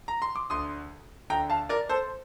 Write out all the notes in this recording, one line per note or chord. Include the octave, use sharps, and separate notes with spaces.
A#5
C6
D6
D2 D3 C6 D#6
D2 D3 G5 A#5
F5 A5
A#4 D5
A4 C5